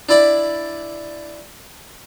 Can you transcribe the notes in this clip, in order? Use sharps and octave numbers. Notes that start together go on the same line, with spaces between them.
D4 E4 D5 B5